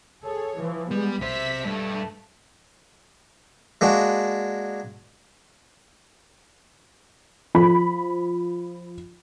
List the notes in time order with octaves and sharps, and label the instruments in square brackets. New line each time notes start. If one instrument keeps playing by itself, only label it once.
[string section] G#4 A4 C#5
E3 F3
[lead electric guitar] G3 [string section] G#3 B3
[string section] B1 E5 B6 [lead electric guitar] C3 C5
[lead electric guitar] G2 [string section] A3
[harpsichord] G#3 A#3 D4 F#4
[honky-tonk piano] F3 B5